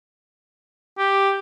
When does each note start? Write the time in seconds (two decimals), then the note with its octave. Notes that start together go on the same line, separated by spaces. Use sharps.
0.98 G4